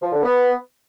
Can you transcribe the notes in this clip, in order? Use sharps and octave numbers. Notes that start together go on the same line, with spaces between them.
F3
D3
B3